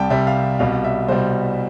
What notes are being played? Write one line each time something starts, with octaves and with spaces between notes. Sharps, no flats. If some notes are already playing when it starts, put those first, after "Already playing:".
Already playing: C2 C3 G3 G5 A5
C2 C3 G3 E5
F5
C2 B2 G3 F5
E5
C2 B2 G3 C5